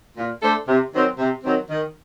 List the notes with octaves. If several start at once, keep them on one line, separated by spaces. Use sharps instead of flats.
A#2
A3 D4 A4 C5
C3
D#3 F#3 C4
C3
D#3 F#3 C4
D#3